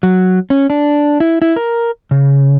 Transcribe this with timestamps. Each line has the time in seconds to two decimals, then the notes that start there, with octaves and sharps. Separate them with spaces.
0.03 F#3
0.50 C#4
0.70 D4
1.20 E4
1.42 E4
1.56 A#4
2.11 C#3